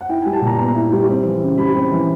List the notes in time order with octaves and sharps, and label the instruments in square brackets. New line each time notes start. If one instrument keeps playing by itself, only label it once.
[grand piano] F#5
E4 G5
G#5
G3
A5
A#2
A#5
B3 A#5
E4
G3
C4
E3
C#3
G3 B5
C4
E3